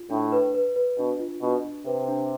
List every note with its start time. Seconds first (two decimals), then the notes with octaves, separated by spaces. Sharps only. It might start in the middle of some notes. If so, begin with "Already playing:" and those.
Already playing: F4
0.10 A2 D4
0.32 B4
0.55 B4
0.76 B4
0.98 B2 D4
1.20 F4
1.42 B2 D4
1.65 D4
1.86 C3 B4
2.08 D4